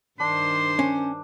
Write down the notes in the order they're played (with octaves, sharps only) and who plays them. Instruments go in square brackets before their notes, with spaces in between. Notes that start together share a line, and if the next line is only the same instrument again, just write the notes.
[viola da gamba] G2 D#3 C5 [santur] D4 [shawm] C6
[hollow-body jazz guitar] C#4